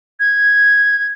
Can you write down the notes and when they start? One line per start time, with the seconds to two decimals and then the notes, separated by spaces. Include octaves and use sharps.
0.20 G#6